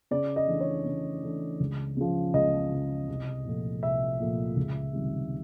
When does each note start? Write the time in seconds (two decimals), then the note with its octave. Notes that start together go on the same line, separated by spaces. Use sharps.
0.11 C#3 D5
0.36 D#5
0.48 E3 A3 D4
0.61 C#5
0.85 C#3
1.23 E3 A3 D4
1.60 C#2
1.97 C#3 F3
2.34 C#2 D#5
2.71 C#3 F3
3.09 C2
3.45 A#2 F3 A3
3.82 C2 E5
4.20 A#2 F3 A3
4.56 C#2
4.93 C3 D#3 G3